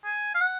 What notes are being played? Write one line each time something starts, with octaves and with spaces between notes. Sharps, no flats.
G#5
F5
F#5